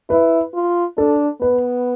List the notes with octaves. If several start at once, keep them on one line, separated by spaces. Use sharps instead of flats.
E4 B4
F4
D4 A4
B3 B4